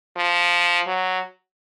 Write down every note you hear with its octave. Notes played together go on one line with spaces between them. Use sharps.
F3
F#3